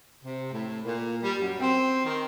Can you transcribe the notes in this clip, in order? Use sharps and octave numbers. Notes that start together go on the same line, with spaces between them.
C3
A2
A#2
G3
F#2
C4
D#3